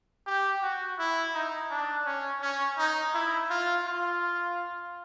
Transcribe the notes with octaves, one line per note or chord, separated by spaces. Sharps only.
G4
F#4
E4
D#4
D4
C#4
C#4
D#4
E4
F4
F4